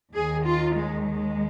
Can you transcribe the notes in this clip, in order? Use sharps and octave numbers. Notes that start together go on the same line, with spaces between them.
D#2 D#3 G#4
F4
G#3
G#3